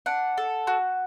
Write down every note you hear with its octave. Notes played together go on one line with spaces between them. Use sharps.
D4 F#5
A4
F#4